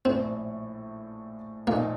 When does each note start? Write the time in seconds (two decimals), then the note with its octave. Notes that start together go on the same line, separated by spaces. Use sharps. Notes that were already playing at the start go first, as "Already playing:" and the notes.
0.05 A#1 A2 A3 C4
1.67 A#1 A#2 A3 A#3 D#4